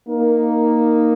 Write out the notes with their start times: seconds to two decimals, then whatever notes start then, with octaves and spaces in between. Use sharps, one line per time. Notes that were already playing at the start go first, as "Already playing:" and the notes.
0.08 A#3 D#4